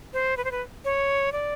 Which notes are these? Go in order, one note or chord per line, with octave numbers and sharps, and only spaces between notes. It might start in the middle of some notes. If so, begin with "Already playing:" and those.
C5
B4
C5
B4
C#5
D5